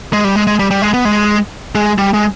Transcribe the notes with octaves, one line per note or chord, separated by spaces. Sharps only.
G#3
G3
G#3
G#3
G3
G3
G#3
B3
G#3
G#3
G3
G#3